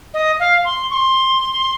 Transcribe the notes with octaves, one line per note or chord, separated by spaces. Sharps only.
D#5
F5
C6
C#6
C6